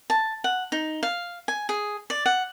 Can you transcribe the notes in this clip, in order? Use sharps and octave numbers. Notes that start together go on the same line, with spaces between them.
A5
F#5
D#4
F5
G#5
G#4
D5
F#5